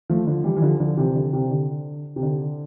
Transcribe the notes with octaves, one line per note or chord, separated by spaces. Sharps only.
F3 A3
D3 F3
E3 G3
E3
D3 F3
D3 F3
C3 E3
D3
C3
D3
C3
D3